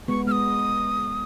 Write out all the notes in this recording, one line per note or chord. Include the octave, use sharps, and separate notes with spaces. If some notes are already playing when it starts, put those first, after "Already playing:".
G#3 B3 C#6
G#3 B3 D#6 F6